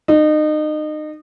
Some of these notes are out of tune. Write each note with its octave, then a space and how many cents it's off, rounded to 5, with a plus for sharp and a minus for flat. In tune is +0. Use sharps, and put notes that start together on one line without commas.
D#4 -30